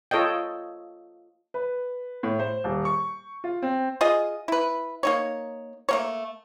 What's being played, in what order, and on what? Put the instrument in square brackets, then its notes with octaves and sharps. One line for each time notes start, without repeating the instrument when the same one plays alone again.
[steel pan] F4 A4 C#5 D#5 G5
[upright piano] B4
A2
C5
D#1
C#6
F4
C4
[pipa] F4 G#4 D#5
E4 B4
A#3 D#4 C#5
A3 A#3 C#5